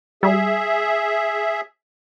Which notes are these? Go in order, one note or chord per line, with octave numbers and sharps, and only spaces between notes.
G3 G#4 E5